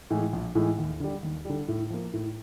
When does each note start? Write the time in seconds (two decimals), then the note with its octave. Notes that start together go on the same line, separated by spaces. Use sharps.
0.10 A2 E3 G#3
0.33 A#1
0.55 A2 E3 G#3
0.78 D#2
1.00 D3 G3
1.23 D#2
1.45 D3 G3
1.68 A2
1.90 F3 A#3
2.13 A2